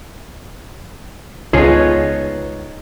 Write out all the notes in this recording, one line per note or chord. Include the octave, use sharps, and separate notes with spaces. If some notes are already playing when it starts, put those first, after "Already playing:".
C#2 B3 D#4 F4 G#4 C#5